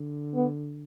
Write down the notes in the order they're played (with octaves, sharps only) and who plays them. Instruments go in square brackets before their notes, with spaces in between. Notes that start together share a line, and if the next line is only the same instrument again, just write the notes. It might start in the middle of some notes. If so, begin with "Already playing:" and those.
Already playing: [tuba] D3
[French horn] B3